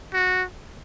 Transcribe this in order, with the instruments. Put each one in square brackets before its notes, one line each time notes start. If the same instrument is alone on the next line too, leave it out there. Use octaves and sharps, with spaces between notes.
[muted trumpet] F#4